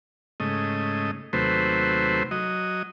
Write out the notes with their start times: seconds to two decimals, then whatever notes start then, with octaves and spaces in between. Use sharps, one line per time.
0.40 G#2 C#3 A3 D#5
1.33 D#2 C3 F#3 A3 B4 C5
2.31 F#3 D#5